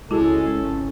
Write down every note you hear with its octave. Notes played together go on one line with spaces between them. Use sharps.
C#2 G#3 C#4 E4 F#4 G#4 A4
G#1